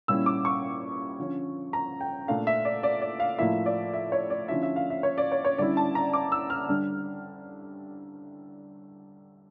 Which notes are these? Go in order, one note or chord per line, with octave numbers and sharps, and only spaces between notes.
A#2 G3 C#4 E4 E6
D6
C#6
D3 F3 C#4
A#5
G5
A#2 A3 D4 F5
E5
D5
D5
D5
F5
A2 F3 A#3 E4 E5
D5
E5
C#5
D5
D3 F3 C#4 E4 E5
E5
F5
E5
C#5
D5
C#5
C#5
D3 G3 C#4 E4 D5
A5
A#5
D6
E6
F6
D3 G3 D4